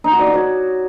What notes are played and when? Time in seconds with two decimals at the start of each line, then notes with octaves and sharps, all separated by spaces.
0.04 D#4
0.12 F#4
0.19 D5
0.26 F#4
0.34 C#5